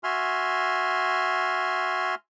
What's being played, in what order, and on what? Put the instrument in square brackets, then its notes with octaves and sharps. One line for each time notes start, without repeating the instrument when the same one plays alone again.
[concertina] F#4 E5 G#5 C6 F6